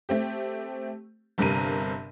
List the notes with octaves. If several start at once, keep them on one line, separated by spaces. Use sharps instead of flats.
A3 C4 G4
G1 G2 C3 A#4 D#7